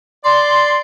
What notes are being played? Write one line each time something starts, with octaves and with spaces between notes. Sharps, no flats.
D5 C6